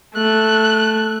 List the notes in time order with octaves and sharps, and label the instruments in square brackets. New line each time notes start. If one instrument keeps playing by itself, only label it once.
[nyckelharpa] A3 [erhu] F#6